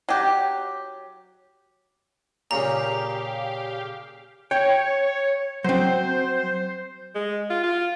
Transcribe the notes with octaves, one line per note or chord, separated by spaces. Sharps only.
F#3 G4
A#2 C#3 G4 F5 A#5
C#5 G5
F#3 C4 C5
G#3
F4
F4